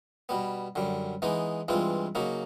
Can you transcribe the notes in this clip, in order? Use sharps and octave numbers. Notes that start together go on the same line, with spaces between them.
B2 G3 B3
F#2 D3 G3
E3 G#3 B3 D#4
G2 E3 G#3 C4 F4
C#3 F#3 A#3 D#4